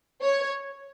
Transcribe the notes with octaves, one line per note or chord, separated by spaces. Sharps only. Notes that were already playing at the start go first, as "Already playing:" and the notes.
C#5